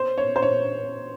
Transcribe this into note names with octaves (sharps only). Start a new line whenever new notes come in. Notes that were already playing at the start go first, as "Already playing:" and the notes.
Already playing: C5
C#5
C5
C#5